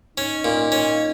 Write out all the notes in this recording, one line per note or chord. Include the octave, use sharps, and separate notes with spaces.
C#4 D#4
A#2
C#4